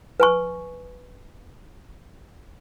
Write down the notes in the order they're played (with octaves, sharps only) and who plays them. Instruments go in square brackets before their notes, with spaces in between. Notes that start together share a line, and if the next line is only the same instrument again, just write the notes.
[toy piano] B4 G#5 C#6